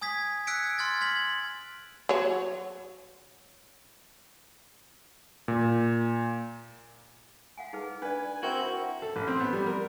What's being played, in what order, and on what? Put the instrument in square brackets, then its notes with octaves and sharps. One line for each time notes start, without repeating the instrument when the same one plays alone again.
[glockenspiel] G#5 D#6 G#6 B6
E6 F#6 G#6 B6 C#7 D7
C6 F6 G#6 A6
G#6 B6 F#7
[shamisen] F#3 C#5
[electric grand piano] A#2
[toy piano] F5 F#5 G#5
D#4 G#4 B4
[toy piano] D4 D5 [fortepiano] B4
[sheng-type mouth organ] G#5
[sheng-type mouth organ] C4 E4 G6 [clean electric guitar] F#4 [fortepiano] A#4 [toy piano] G5 C#6
[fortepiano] A4
A1
C4
B3
G3
A#4